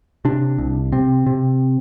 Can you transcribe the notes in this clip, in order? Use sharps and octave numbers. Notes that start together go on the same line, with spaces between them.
C3 D4
C2
C3 C4
C3